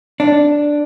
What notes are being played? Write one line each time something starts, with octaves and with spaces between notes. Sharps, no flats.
D4